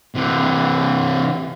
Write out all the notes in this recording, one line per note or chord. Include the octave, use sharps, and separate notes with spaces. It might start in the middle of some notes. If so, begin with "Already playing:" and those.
C3 E3